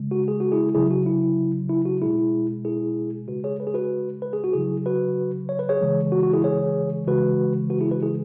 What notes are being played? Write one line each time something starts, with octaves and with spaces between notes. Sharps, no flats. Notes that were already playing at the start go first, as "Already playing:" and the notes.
Already playing: C#3 G#3
F#4
G#4
F#4
E4 G#4
C#3 F#3 E4 G#4
F#4
E4
E4
F#4
B2 G#3 E4 G#4
E4 G#4
C#3 G#3 F#4 B4
G#4 C#5
B4
G#4
F#4 B4
B4
G#4
F#4
C#3 F#3 E4 G#4
F#4 B4
C#5
B4
G#4 C#5
C#3 E3 G#3
F#4
F#4
E4 G#4
G#4 C#5
C#3 E3 G#3 F#4 B4
F#4 B4
E4 G#4
F#4 B4
E4 G#4